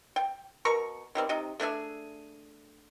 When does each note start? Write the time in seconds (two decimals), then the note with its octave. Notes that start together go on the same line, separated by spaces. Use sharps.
0.16 G5
0.65 B2 A#4 A#5 C#6
1.15 D#3 G3 C4
1.29 C3 D#4 D#5
1.60 A3 D4 G#4 E5